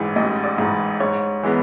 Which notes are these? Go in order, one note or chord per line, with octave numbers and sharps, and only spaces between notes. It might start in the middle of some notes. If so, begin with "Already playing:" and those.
Already playing: A1 G#2 E3
A1 D#5
D5
G#2 E3
G#2 C#5
E3 G#3 B3